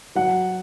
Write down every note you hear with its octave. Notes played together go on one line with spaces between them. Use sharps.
F#3 F#5